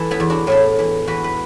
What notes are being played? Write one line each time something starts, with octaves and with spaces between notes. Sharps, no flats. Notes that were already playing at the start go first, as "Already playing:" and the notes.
Already playing: E3 A4
B3 E4
E2
D4 F#4
A2 E4 A4
E3
E3 F#4 B4
B4